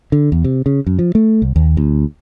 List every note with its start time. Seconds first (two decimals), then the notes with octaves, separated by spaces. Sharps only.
0.12 D3
0.32 E2
0.44 C3
0.66 C#3
0.87 F#2
0.99 F3
1.15 A3
1.42 C2
1.56 D#2
1.77 D2